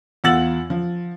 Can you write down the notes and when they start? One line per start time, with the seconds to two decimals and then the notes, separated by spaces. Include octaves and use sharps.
0.24 E2 F4 F#5 E6 A6 F#7
0.70 F3